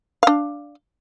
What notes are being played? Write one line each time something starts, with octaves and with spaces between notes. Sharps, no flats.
D4 F5